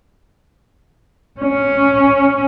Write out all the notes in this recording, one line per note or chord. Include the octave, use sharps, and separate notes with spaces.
C#4